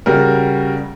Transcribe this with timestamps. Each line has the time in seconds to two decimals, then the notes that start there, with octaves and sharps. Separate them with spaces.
0.06 C#3 G3 F#4 A#4